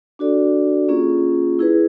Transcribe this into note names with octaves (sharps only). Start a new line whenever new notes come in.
D4 F#4 A4 D5
A#3 C#4 F4 G#4
E4 G#4 B4